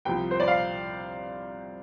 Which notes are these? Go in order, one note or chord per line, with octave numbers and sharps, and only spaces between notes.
C2 C3 F3 G5
C5
D5
F5